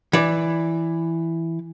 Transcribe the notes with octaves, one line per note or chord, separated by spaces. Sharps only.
E3 D5